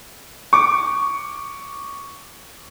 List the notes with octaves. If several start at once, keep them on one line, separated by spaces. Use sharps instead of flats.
C#6 D6